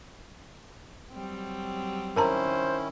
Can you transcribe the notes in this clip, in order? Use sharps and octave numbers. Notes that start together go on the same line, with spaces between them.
F#3 G3 C4
D#3 C#4 E4 A#4 C5 A5 A#5